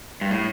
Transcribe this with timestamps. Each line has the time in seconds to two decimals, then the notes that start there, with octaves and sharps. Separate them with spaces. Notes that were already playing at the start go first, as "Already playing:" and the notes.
0.21 G2
0.31 A2